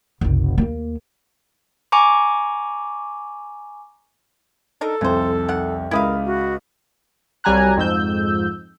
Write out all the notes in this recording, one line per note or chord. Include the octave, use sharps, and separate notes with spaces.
F#1 C2
D#2 A#3
G#5 A#5 C#6 D6
D4 D#4 A4 A#4
C2 F2 C#3 C5
D#3 F#5
C#2 E4 G4 A#4 F5 B5 D#6
F#4
C2 F#3 G3 G#5 A#5 F#6
F2 G#2 E6 G6